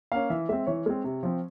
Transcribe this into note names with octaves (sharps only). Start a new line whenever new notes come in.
A#3 C#4 F5
E3 E5
G#3 C4 E5
E3 C#5
G#3 C4
C3
F3 C4